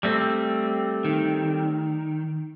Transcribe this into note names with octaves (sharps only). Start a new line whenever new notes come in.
G3 A3 C4
D#3